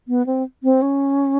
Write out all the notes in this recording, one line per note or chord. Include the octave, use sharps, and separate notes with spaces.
B3
C4
C4
C#4